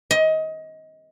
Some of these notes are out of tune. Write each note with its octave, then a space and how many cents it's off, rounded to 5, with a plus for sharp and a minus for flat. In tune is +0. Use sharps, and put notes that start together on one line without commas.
D#5 +25